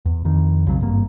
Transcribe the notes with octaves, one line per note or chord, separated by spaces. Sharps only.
E2
F2 D#3
B1 C#3 F#3
G#1 G2 A#3